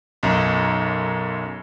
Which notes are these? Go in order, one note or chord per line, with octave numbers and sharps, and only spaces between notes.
B1 F#2